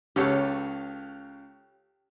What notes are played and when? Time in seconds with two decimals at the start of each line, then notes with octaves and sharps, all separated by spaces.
0.16 C#2 C#3 G4 A4 C#5